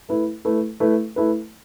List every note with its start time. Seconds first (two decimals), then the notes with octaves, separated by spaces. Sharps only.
0.09 A3 E4 B4
0.45 A3 E4 B4
0.80 A3 E4 B4
1.16 A3 E4 B4